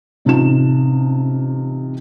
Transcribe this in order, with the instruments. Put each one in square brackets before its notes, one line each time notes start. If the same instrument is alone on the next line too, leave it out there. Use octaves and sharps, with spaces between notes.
[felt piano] A1 C3 D#4 F4 A5 E7